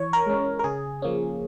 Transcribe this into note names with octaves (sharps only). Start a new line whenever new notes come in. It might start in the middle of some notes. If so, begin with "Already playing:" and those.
Already playing: E3 C#5
A#4
G#3 C#4
A#4
C#3 G#4
F3 A#3 C#4